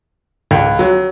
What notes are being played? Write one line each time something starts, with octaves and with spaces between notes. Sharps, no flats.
C#2
F#3